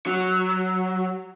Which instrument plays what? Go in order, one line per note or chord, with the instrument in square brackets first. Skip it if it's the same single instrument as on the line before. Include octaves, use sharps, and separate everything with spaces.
[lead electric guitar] F#3